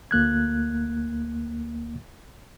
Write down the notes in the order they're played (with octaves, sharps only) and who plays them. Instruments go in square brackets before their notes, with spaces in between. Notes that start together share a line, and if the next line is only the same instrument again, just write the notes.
[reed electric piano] D2 A#3 F#6 G#6